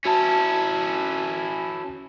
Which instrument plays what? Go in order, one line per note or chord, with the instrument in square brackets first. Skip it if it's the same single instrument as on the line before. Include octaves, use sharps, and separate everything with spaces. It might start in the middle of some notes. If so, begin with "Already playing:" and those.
[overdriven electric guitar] C#4 E4 [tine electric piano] F#4 A5